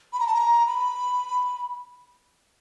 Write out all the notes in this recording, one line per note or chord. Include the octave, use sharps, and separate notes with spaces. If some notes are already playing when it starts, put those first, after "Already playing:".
B5
A#5
A5
A#5
B5